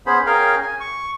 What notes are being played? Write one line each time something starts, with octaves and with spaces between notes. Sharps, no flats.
B3 C#4 G#4 C5 B5
C#4 G#4 A#4 F5 G5
G#5
C#6